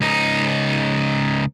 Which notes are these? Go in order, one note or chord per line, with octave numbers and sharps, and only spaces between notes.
C#2 D#4